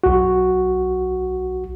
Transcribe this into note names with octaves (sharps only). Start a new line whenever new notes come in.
B1 F#4